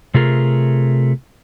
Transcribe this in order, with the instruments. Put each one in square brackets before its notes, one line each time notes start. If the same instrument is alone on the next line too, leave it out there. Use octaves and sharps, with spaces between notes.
[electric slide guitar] C3 A3 F4 G#4 A#4